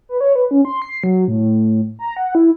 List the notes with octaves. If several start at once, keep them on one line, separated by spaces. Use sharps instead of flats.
B4
C#5
B4
C#4
C6
C7
F#3
A2
A#5
F#5
E4